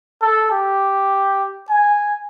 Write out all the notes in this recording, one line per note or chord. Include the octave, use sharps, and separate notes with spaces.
A4
G4
G#5